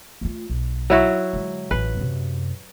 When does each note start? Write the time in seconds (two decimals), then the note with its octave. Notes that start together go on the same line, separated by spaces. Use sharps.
0.21 A3 F4
0.50 B1
0.90 F#3 E4 F#4
1.33 D3 G#3
1.71 A1 D#4 B4
1.97 F#2 C3